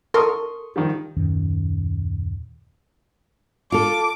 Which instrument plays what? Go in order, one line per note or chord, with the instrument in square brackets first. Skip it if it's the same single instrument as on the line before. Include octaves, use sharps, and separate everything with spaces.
[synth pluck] A4 A#4 [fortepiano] C6 C#6 D#6
[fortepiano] D#3 F3 G3
[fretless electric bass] D#1 F#2 D#3 C#4
[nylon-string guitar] F4 A4 [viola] D6